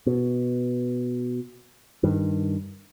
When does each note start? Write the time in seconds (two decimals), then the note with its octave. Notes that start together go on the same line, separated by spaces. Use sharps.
0.06 B2
2.03 G2 D#3